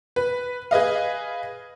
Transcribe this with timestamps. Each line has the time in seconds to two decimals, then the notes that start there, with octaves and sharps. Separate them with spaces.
0.16 B4
0.71 G#4 B4 D#5 F5